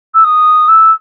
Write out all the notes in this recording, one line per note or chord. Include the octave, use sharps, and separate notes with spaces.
E6
D#6
E6